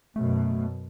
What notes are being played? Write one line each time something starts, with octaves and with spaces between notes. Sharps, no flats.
F#2 B2 A3